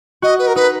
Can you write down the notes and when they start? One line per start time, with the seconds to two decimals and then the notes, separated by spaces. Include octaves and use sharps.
0.22 F#4 D#5
0.39 B4
0.47 A#4
0.56 D#4 B4